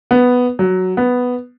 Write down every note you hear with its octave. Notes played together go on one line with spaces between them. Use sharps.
B3
F#3
B3